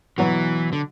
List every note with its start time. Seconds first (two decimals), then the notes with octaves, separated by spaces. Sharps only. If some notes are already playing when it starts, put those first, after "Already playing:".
0.18 B2 E3 F#3 B3 F#4
0.73 D3